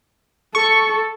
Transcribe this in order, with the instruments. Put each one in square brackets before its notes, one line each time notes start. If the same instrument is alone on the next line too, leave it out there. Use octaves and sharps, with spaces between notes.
[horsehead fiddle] A4 [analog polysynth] C#6